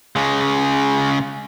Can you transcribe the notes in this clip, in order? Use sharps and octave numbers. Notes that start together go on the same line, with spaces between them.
C#3 G#3